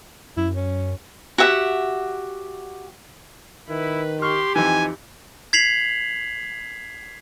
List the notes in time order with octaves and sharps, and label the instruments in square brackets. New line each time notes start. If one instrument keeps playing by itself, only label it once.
[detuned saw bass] F#2 [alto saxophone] E4
[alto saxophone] C#4
[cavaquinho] F#4 G4 E5 F#5
[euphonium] D#3 [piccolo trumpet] E4 [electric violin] B4
[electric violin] G4 [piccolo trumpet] C6 [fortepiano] C#6 F6
[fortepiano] F2 E3 [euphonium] D#4 [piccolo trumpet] G#5
[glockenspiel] G#6 B6 C7 F7 F#7